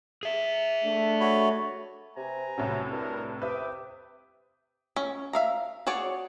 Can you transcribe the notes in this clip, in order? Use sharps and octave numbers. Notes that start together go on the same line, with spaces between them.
G#4 E5
A3 D4
F#4 C#5 B5
C3 B4 G#5 A#5
C2 A2 C3 F#3
G2 E4 A#4
C3 B4 E5 G5 D6 D#6
C#4
E5 F5 A#5
F#4 G#4 C#5 D5